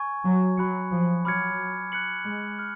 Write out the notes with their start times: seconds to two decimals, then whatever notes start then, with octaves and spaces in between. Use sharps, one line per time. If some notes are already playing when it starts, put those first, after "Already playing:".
Already playing: G#5 C#6 G#6
0.24 F#3
0.58 F#3 B5 F#6 C#7
0.91 F3
1.25 F#3 B5 D6 F6 G#6 C#7
1.92 F#6 C#7 F#7
2.25 G#3
2.59 F6